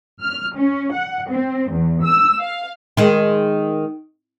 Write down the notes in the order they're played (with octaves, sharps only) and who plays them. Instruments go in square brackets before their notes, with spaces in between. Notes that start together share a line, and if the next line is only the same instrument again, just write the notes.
[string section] F6
C#4
F#5
C4
E2
E6
F5
[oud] D#3 G#3